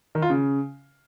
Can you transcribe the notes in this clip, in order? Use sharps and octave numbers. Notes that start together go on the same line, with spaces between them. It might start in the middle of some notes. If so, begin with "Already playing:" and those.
D#3
F4
C#3